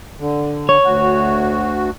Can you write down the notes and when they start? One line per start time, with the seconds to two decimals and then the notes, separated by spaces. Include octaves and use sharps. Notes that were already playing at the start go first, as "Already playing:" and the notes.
0.20 D3
0.69 C#5
0.84 D2 F#4